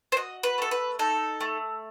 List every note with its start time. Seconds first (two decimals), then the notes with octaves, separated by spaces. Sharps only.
0.12 C5
0.17 F#4 D#5
0.43 B4
0.58 A3 A4
0.71 B4
0.99 D#4 A4
1.41 A3